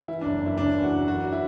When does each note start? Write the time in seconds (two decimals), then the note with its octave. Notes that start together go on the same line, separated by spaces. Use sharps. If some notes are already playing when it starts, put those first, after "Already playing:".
0.08 E3 E4
0.21 D4
0.25 F#1
0.41 F#2
0.46 E4
0.57 F#1 D4
0.74 E3
0.83 F#4
0.91 F#1
1.08 E3 F#4
1.32 E4